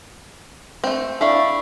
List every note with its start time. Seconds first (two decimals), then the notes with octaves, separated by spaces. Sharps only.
0.84 A3 C4
1.21 D4 E4 A4 E5 F5 C#6